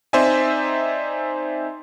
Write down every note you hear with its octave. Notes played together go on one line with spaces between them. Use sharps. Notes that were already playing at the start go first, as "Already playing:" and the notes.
C4 D#4 C5 D5 E5 G#5